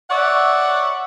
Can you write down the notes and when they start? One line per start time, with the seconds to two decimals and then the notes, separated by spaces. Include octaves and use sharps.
0.10 C#5 D5 E5 F#5